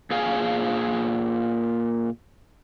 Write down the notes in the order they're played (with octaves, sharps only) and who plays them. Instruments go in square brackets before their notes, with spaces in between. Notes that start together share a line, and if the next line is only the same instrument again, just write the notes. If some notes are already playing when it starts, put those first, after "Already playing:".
[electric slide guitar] A#2 G#4 F5 G#5